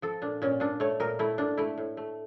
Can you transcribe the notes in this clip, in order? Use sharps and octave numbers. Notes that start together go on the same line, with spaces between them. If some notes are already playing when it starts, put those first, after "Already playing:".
F3 A4
A#2 D4
A#2 C#4
A#2 D4
A3 C#5
A#2 A#4
A3 E4
A#2 D4
A3 E4
A2
A3